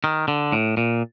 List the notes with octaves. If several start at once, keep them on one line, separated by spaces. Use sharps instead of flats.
D#3
D3
A2
A#2